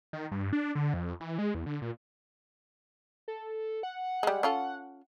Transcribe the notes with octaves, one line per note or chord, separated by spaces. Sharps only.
D#3
G2
D4
D3
F2
E3
G#3
E2
D3
A#2
A4
F#5
G3 G#3
C#4 F4 A4